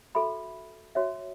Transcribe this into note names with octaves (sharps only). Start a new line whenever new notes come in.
F#4 A4 E5 B5
F#4 C#5 E5